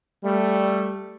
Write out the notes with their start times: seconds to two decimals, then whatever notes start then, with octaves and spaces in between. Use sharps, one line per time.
0.24 G3 A3